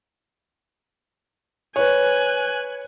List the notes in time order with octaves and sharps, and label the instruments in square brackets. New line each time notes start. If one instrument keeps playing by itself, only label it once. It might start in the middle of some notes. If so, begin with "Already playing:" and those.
[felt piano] B4 C#5 [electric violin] G#5 F#6